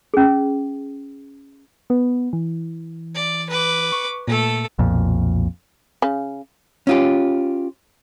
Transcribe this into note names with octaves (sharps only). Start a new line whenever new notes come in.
C#4 G#4
B3
E3
D5
B4 D6
C#6
A#2 A3 A4
B1 F2 A#2
C#3
C#4 F4 G4